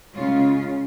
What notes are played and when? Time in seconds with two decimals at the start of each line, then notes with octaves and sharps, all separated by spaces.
0.14 C#3 G#3 C#4 F4